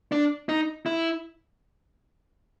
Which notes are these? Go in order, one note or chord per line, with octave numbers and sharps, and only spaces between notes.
D4
D#4
E4